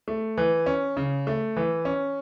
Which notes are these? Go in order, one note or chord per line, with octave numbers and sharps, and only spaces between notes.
A3
E3
C#4
C#3
A3
E3
C#4